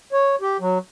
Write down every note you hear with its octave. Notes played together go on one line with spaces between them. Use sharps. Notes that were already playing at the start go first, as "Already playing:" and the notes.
C#5
G4
F#3